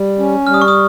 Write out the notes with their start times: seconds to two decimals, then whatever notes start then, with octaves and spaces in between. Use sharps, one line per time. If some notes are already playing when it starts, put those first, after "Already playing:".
Already playing: G3
0.19 C#4
0.47 G3 F6
0.54 D#6
0.62 C#6
0.68 D#6